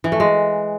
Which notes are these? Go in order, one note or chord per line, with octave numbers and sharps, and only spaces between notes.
E3
A3
G#3